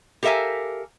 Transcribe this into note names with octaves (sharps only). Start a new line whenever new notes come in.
G4 A4 A#4 E5 F5 G#5